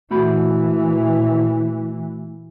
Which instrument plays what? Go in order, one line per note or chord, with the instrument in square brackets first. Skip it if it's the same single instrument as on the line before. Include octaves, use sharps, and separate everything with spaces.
[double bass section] A#2 E3 [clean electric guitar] A3 F#4 B5